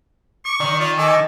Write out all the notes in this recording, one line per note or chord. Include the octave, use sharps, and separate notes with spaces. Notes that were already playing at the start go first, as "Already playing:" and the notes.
C#6 D6
D#3 D5
F4
A4 D#5 G#5 D6